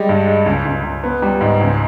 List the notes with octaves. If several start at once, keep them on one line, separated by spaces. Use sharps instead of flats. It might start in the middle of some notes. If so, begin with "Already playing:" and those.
Already playing: G3 G#3
G2
G#3
C#2
C#2
C#2
B3
G3
G#2
C#2